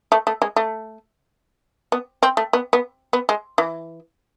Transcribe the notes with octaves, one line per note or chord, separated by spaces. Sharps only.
A3
A3
G#3
A3
B3
C4
A3
B3
B3
B3
G#3
E3